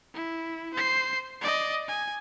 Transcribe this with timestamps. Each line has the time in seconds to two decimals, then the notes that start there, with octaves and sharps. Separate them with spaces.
0.14 E4
0.74 C5 C7
1.41 D5 D#5
1.88 G#5